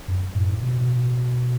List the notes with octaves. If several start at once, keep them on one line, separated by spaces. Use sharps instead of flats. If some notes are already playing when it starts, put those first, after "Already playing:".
F#2
A2
B2